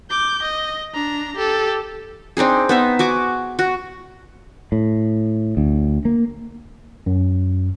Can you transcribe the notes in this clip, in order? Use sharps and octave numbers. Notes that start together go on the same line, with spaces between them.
D6 G6
D#5
D4 A#5
G4 A4
C4 D4 D#4 G#4
B3 D#4 E5
F#4 G#5 D6
F#4
A2
D2
A#3
F#2